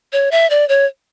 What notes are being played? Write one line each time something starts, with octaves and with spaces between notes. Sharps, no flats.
C#5
E5
D5
C#5